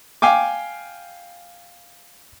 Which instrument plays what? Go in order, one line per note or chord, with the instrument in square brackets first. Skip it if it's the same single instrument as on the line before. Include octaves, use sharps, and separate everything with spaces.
[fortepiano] F5 G5 G#5 D6